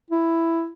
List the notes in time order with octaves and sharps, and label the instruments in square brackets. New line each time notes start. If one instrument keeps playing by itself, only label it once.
[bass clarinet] E4